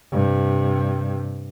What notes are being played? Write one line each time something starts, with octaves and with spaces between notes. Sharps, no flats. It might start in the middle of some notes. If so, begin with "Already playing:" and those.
G2 C3